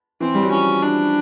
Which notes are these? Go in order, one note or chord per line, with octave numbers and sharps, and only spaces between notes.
E3 C4
G3
F#3
F3 C#4
D4